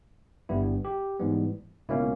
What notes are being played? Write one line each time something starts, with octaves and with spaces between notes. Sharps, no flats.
G1 G2 G3 B3 E4
G4
G#2 E3 G3 B3
C#2 B2 A#3 C#4 E4